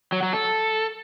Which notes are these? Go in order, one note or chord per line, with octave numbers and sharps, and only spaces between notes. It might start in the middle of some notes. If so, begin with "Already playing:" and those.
F#3
F#3
A4